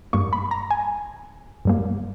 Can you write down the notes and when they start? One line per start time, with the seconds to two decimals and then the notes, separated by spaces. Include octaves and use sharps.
0.13 G2 G3 A#3 C#6
0.33 B5
0.51 A#5
0.71 G#5
1.65 G2 G3 A#3